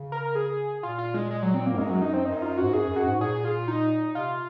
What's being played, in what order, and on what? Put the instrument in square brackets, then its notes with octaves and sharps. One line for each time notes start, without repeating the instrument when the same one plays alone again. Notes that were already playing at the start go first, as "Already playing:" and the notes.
Already playing: [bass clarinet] C#3
[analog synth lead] A#4
G#4
[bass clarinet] A#2 [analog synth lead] F4
[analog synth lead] F4
G#3
G#3
F#3
C4
A#3
[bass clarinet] G#2
[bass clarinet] F#2 [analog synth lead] G#3
[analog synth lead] F#3
D#4
C4
[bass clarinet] F#2 [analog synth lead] D#4
[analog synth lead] F4
[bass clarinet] G#2 [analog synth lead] F#4
[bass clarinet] F#2 [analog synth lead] G#4
[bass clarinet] F#2
[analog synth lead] F#4
[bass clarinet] G#2
[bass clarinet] A#2 [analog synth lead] G#4
[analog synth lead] F4
D#4
[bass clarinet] C3 [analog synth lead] F4